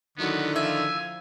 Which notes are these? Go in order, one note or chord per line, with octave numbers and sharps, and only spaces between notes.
D3 D#3 F#3 B3 E4 F#4
F3 F4 E5 G#5